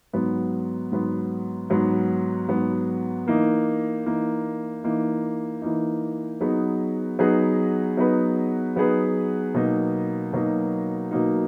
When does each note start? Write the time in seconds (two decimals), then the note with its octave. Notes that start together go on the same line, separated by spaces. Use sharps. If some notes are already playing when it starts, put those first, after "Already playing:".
0.13 G#2 F#3 B3
0.92 G#2 F#3 B3
1.70 G#2 F#3 B3
2.49 G#2 F#3 B3
3.27 E3 A#3 D#4
4.06 E3 A#3 D#4
4.84 E3 A#3 D#4
5.62 E3 A#3 D#4
6.41 F#3 B3 D#4 G#4 B4
7.19 F#3 B3 D#4 G#4 B4
7.97 F#3 B3 D#4 G#4 B4
8.76 F#3 B3 D#4 G#4 B4
9.54 B2 F#3 A#3 D#4
10.33 B2 F#3 A#3 D#4
11.11 B2 F#3 A#3 D#4